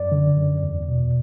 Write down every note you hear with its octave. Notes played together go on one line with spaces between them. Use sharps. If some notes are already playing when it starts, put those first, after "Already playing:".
Already playing: F#2 D5
D3
F#2
E2
B2